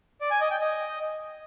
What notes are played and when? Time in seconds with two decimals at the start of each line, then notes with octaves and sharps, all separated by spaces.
0.21 D5
0.31 G#5
0.41 D#5
0.51 G5
0.60 D#5